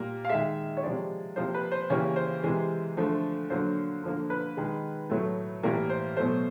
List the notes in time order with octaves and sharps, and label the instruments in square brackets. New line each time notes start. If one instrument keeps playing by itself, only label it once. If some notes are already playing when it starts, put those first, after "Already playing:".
Already playing: [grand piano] A#2 G3 A#3
F5
D#3 G#3 E5
C#5
C3 F3 G#3 D5
C3 F3 A#3 C5
B4
C5
C#3 E3 G3 A#3 C#5
C5
C3 E3 G#3
D3 F3 A3
D3 F#3 A#3 C5
D3 F3 A#3
B4
D#3 G#3
A2 F#3 A3
A2 E3 G3 A#3 A#4
C5
B2 F#3 A3 C5